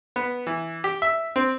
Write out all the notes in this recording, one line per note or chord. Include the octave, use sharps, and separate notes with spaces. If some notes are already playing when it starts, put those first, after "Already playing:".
B3
E3
G4
E5
C4